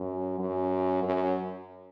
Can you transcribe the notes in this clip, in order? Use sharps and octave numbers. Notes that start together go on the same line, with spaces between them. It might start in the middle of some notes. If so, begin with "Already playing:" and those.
Already playing: F#2
F#2
F#2